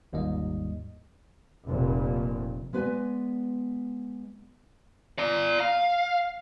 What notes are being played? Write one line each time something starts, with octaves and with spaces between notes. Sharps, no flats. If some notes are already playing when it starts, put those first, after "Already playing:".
G1 D#2 G#2 G3 D#5
F1 A#2
G#3 B3 B4 C5 D5 G#5
D5 A#5
F5